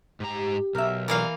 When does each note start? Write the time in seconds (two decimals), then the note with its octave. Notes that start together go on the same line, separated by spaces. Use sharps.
0.20 G#2 G4 A#5
0.75 B1 A#4 E5
1.08 E3 F3 A#3 E4 D5 F5